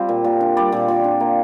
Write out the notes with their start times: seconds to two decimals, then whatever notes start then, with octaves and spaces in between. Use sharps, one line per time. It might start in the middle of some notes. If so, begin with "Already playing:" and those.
Already playing: G3 C4 F4
0.09 A#2
0.24 A#2
0.41 D4
0.57 G3 D5
0.72 A#2
0.88 A#2
1.04 D4
1.20 A#3